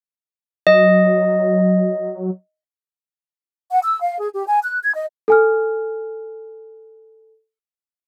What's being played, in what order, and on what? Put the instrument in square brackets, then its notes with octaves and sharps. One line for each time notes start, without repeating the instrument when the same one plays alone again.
[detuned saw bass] F#3 [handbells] D#5
[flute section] F#5
E6
F5
G#4
G4
G#5
F#6
G#6
D#5
[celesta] A4 G#5 F6